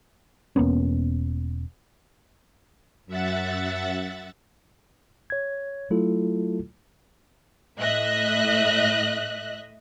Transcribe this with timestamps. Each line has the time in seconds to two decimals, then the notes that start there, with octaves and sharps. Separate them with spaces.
0.56 E1 A#3 B3 C#4
3.07 F#2 E5 F#5 A6
5.30 C#5 G#6
5.90 F#3 A3 E4 F4 A4
7.81 A2 D#5 E5 F#6